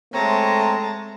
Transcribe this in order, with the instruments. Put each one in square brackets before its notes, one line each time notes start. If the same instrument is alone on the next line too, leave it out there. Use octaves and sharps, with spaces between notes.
[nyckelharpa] G#3 A5 [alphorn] A3 [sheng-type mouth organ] C4 C#5 [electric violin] A#5